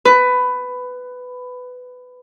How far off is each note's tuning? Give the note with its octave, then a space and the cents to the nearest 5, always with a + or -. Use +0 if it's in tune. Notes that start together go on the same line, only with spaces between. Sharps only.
B4 +15